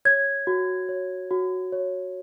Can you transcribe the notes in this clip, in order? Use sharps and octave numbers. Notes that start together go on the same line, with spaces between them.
C#5 G#6
F#4
C#5
F#4
C#5